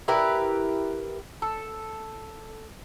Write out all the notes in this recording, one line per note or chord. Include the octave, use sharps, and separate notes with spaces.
E4 G4 A#4 B4
A4